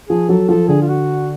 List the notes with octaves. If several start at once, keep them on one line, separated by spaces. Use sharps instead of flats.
F3 G#4
F#3 A4
F3 A4
D3 G#4
F4
F#4